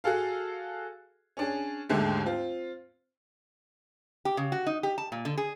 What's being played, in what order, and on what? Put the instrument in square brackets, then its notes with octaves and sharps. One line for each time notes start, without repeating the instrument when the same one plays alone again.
[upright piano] F#4 G#4 A4 F5
C#4 D4 G#4
D#2 G#2 D3 G#3 A3
C4 F4
[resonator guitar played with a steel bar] G4
C#3
F#4
D#4
G4
A5
A#2
D3
G#4